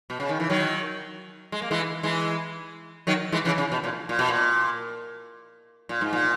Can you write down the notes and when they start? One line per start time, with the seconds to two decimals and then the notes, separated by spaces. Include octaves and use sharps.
0.10 B2
0.20 C#3
0.29 D#3
0.40 E3
0.50 D#3 F#3
1.52 G#3
1.62 A#3
1.71 E3 G#3
2.03 E3 G#3
3.07 D#3 F#3
3.32 E3 G#3
3.45 C#3 E3
3.58 C#3
3.72 B2
3.84 A#2
4.09 A#2
4.19 B2
4.29 A#2
5.89 A#2
6.01 G#2
6.13 A#2